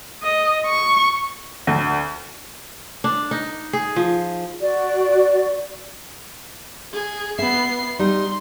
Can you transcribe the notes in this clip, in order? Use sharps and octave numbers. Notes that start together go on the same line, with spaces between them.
D#5
C#6
D2
D4
D#4
G#4
F3
F#4 D5
G#4
B3 E5 C7
G3 D#4 C6